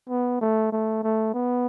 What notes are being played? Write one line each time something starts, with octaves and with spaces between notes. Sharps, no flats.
B3
A3
A3
A3
B3